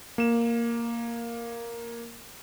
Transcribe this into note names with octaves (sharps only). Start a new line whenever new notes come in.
A#3 E7